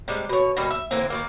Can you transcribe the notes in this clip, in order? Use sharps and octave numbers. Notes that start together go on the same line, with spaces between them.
C3 G3 G#3
B2 C#5
B2 D#3 G3
E5
D3 E3 A#3 C4
D#3 E3 A#3